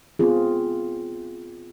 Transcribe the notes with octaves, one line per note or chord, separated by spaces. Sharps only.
B3 C4 F4 G#4